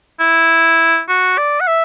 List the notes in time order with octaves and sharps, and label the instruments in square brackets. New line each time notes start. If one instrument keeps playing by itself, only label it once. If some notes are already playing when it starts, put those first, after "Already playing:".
[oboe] E4
F#4
D5
F#5
E5